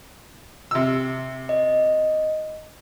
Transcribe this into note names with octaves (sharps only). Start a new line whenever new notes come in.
C3 E6
D#5